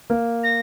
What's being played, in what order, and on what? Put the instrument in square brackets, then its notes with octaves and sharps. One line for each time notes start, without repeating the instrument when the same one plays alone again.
[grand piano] A#3
[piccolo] A#6